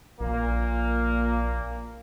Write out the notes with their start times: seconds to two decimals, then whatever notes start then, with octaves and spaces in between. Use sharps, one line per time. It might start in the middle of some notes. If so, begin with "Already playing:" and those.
0.20 A#1 A#2 A#3